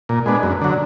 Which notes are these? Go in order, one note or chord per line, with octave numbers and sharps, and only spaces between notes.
A#2
G#3 B3 D4
F#2
D3 F#3